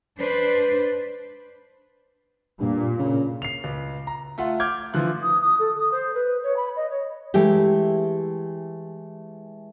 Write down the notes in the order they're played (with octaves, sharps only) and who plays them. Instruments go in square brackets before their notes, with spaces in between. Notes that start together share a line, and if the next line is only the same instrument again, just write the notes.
[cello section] D4 B4 C5
[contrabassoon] G2 [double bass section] A#2
[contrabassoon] C#3
[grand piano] C7 F7
C#2
A#5
A3 F4 F#5
D6 F6 G6 G#6
D3 E3 F3 F4 F#6
[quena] D#6
D#6
A4
D#6
C5
B4
C#5
B5
D#5
C#5
[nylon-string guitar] E3 G#3 A3 E4 G4